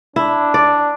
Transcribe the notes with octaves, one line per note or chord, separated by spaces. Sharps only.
D4 E4
D5